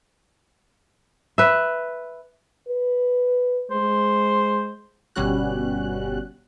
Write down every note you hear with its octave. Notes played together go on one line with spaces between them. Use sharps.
B4 E5
B4
G#3 C5
G1 B2 G3 C#4 F#4 F#6